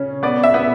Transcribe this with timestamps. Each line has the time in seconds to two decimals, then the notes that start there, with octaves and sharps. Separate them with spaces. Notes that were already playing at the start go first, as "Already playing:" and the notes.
Already playing: C#3 C#4
0.23 B3 D5
0.43 E5
0.54 B3